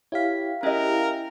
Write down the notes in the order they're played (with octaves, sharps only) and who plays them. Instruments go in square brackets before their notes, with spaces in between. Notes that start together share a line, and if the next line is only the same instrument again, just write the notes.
[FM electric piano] E4 G4 F5 [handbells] C#5 B6
[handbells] C#4 E5 G5 [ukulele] G#4 D#5 [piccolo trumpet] A#4